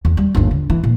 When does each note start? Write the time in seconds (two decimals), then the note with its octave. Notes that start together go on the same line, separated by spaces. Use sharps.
0.05 E2
0.17 G3
0.35 G1 D#2
0.51 D3
0.70 E3
0.84 A#2